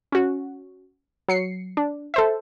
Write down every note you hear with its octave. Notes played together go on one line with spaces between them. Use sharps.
C#4 F#4
F#3 C7 C#7
D4
A4 C5 E5